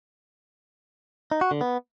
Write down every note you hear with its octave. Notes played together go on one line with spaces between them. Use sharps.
D#4
F#4
D3
B3